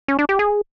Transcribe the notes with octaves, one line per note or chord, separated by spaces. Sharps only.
C#4
D4
G4
G#4